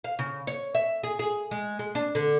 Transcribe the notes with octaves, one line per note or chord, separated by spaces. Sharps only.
F5
C#3
C#5
E5
G#4
G#4
G#3
G#3
D4
D3